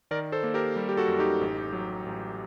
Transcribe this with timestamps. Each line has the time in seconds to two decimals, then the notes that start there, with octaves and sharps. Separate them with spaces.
0.11 D#3 A#4 D5
0.32 A4 C5
0.43 A#3
0.54 G4 A#4
0.76 G3
0.89 G4
0.97 F#4 A4
1.08 F#2
1.19 D#4 G4
1.41 A1
1.73 F#3
2.06 A1